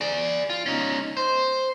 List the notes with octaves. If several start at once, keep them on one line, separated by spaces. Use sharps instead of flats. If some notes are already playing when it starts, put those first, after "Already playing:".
G#4 D5
F4
C#4 D#4
C5